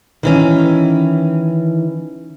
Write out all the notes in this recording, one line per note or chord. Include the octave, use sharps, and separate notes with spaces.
D#3 E3 C#4